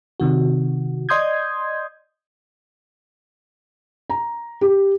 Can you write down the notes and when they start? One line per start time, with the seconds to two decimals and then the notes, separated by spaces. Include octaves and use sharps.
0.20 C3 D#3 F#4
1.09 D5 D#5 C6 D#6 G6 G#6
4.10 A#5
4.61 G4